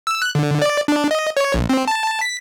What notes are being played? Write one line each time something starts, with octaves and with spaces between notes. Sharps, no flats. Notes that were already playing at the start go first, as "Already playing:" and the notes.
E6
F#6
D3
D5
D4
D#5
C#5
A#1
C4
A5
B6